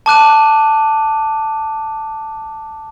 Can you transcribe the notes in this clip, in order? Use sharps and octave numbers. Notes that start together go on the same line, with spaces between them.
A5 D6 F#6 D#7